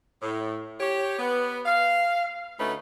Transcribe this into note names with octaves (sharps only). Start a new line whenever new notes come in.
A2
G4 C#5
B3
F5
D2 A3 C#4 D#4 B4